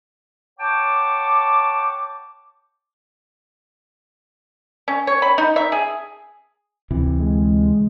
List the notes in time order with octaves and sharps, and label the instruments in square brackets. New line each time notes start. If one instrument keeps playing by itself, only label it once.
[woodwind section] C#5 F#5 G5 A5 C#6 D6
[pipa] C#4
C#5
B5
D#4
E5
G#4
[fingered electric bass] D2 C3 E3
[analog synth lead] G#3